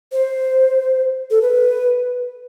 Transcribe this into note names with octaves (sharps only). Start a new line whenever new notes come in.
C5
A4
B4